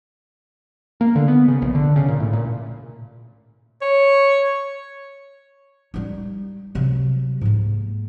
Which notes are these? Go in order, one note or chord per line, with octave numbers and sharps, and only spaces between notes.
A#3
D3
B3
C#3
A#1
D3
C#3
A#2
A2
A#2
C#5
G3 D#4
C3 F#3
G#2 A#3